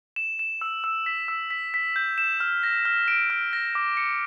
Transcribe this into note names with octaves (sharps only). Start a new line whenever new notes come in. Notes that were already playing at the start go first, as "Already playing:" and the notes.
E7
E7
E6
E6
B6
E6
B6
B6
G6
E7
F6
A#6
F6
D7
F6
A#6
D6
C#7